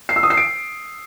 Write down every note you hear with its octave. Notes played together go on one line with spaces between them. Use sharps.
C7
E6
D#6
C7
D7